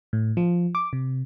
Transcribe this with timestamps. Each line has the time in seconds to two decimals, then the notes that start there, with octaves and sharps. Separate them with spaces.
0.13 A2
0.37 F3
0.75 D6
0.93 C3